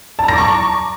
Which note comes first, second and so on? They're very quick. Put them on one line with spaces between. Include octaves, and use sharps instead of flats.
A5 A#5 A#6 D6 C#6